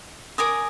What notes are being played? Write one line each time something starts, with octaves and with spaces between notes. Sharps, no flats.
A#4 D5 G#5 D#6